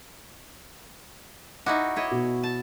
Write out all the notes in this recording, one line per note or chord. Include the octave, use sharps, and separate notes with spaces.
D#4 E4 F#4 D6
E4 C#5 D#5
B2
A5